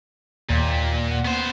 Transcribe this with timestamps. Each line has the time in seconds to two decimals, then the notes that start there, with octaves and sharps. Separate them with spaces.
0.50 D#2 A#2 G5 B6
1.11 F#5
1.25 B3 C5